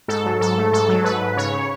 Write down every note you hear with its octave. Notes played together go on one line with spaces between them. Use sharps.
G#2 A4
F#3
G#2 A4
A3
G#2 A4
F#3
G#2 B4
G#2
C#3 C#5
C#3